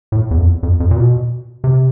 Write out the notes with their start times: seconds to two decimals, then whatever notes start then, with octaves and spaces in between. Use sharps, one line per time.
0.12 A2
0.31 E2
0.37 F2
0.63 F2
0.80 F2
0.91 A#2
0.96 B2
1.64 C3